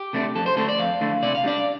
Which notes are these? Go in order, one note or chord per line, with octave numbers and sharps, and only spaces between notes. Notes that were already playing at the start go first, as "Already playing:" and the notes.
Already playing: G4
C3 A3 D4
F2 A4
C5
D3 A3 D4 A4
D5
F2 F5
D3 A3 D4
C3 D5
F5
G3 D4 D5